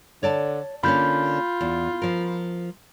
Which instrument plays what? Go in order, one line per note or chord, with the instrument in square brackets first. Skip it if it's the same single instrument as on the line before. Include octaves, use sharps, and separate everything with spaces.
[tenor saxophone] D3 [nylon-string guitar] C#5 D5 A5
[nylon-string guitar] D3 A#3 C#4 [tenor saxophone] F4 [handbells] B5 G6
[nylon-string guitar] E2
F3 A#4